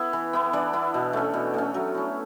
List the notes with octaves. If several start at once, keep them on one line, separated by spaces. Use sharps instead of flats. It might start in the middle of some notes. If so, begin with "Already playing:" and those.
Already playing: B3 E4
E3
B3 E4
E3 D4 D5
B3 E4
B2
A3 C#4
B2
A3 C#4
F#3
C#4 E4